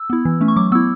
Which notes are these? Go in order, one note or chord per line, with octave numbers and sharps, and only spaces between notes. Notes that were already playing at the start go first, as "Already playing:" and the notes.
Already playing: E6
B3 E4
E3
A3 C#4
C#6
F#3 D6
B3 E4 E6